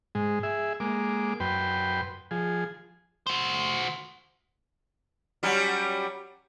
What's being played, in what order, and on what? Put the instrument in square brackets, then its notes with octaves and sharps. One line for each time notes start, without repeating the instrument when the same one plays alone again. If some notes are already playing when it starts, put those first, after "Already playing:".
[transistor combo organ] G#2 G#3
G#4 E5
G#3 A#3 D6
F#2 B4 G5 C6
F3 G#4
[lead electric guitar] F#4 C5
[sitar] F#3 G3 C#4